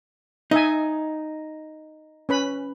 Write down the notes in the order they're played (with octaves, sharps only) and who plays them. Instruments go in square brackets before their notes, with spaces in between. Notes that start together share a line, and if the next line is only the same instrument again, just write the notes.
[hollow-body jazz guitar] D#4 [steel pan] D#5 E5 G#5
[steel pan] C#4 B4 B5